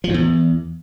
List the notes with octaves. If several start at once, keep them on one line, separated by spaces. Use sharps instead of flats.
F3
G#2
E2